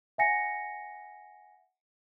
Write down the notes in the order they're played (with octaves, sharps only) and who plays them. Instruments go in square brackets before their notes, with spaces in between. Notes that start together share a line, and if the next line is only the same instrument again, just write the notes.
[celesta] E5 F#5 G#5 A#6 C#7